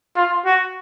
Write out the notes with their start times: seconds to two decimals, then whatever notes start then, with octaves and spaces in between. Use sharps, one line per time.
0.16 F4
0.45 F#4